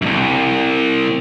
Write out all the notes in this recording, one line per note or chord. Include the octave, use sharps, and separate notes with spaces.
C2 F#2